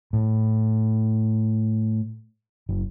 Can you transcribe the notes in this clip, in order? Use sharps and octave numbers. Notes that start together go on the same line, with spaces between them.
A2
F#1